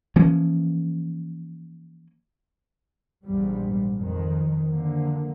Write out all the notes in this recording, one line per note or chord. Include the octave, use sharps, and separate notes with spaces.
E3 F3 A#3 C#4
A#1 E2 G#2 G3
F2 D#3
D3 F3 A#3